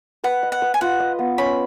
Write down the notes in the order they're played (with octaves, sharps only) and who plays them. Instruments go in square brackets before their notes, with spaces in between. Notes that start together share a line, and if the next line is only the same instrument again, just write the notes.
[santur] B4 [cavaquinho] F#5
[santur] D#5
[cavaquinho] F#5
[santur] B4
[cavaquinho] G#5
[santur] F4 [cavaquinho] F#5
[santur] D#5
B3
[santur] C#4 [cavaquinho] B5